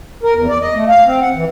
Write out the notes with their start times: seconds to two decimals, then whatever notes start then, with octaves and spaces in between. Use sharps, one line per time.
0.23 A#4
0.35 E2
0.48 D5
0.61 D#5
0.75 A3
0.88 F5
1.05 C4
1.21 F#5
1.34 E3